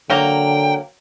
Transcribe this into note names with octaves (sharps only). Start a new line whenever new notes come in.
D3 F#3 A#3 G5